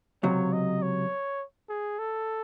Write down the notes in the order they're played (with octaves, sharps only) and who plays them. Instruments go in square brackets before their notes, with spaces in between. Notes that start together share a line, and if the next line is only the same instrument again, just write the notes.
[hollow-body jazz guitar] C#2 C3 F#3 [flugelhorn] C#5
[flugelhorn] D#5
C#5
G#4
A4